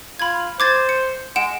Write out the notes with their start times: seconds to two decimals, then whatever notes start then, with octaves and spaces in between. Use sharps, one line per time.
0.19 F4 B5 G#6
0.60 C5 D6 G#6 A6
0.89 C#7
1.36 G#3 F#5 D7 E7